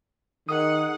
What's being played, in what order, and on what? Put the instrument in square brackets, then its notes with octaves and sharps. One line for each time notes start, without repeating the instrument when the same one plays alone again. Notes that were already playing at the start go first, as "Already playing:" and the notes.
[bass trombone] D#3 [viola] G#4 F#5 [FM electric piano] D#6